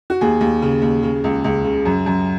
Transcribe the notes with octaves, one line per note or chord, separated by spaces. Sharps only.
F#4
D#2 G#4
D#2
C#3
D#2
C#3
C#2
C#2
C#3
F#2
F#2